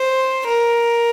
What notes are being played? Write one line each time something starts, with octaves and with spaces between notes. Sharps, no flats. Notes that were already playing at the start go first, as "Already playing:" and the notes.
Already playing: C5
A#4